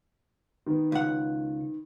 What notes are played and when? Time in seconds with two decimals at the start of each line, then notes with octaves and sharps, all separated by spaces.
0.67 D#3 B3
0.92 C#2 F#5